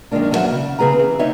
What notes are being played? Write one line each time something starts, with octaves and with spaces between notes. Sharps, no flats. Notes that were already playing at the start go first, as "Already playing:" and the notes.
F#2 D#3 E3 G#3 A#3 D4
F2 F#3 D4 A4 E5 F#5
C#3
C#3 C4 G#4 B4 A#5
E3
A#3 C4 D#4 C#5 E5